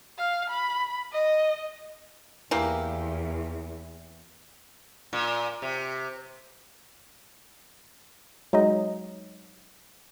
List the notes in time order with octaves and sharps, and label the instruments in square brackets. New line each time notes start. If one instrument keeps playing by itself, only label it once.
[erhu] F5
B5
D#5
[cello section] E2 [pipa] E3 A#3 G4
[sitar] A#2
C3
[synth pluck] F#3 G#3 D#4 D#5